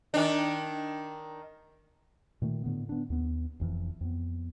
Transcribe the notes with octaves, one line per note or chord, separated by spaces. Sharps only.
D#3 D4
A#2 D#3 A3
A2 D3 B3
B3 D4
D#2 B3
F1 F2 E3 F3
F2 B3